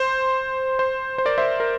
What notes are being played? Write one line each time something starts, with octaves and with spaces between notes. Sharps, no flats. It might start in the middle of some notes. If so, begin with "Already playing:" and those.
Already playing: C5
C5
C5
A#4 D5
C5 E5
A#4